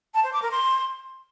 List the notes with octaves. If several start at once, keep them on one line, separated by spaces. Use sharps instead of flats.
A5
C5
D6
A#4
C6